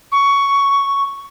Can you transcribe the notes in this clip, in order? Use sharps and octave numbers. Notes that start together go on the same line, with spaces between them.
C#6